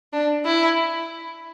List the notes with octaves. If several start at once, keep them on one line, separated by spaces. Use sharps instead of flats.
D4
E4